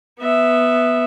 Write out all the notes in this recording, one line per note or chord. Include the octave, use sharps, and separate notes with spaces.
B3 E5